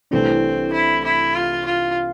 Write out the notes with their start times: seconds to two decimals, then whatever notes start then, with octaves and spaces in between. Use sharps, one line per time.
0.11 C2 C3 E3 A3 C4 D4
0.73 E4
1.05 E4
1.35 F4
1.66 F4